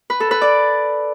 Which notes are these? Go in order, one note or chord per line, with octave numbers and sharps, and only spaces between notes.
B4
A4
B4
D5